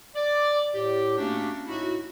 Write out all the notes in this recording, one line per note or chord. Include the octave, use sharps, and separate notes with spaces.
D5
A2 G4
A3 A#3 C#4 D4 F#4 G4
A2 D#4 E4 F#4